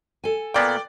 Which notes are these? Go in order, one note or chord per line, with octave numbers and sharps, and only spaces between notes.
A4 G#5
A#2 A#3 B3 D5 G5